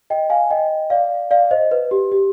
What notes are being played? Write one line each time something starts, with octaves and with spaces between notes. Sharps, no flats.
D#5 G5
F5 G#5
D#5 G5
D5 F5
D5 F5
C5 D#5
B4
G4
G4